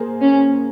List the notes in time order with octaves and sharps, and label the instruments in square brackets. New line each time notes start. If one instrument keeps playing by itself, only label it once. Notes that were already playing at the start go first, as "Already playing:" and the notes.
Already playing: [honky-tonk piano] A#3 G#4 C5
[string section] C#4